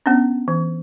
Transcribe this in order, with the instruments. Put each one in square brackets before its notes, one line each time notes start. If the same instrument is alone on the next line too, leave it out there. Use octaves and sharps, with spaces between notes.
[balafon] B3 C#4 D4
E3